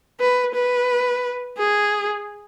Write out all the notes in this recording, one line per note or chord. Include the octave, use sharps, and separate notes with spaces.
B4
B4
G#4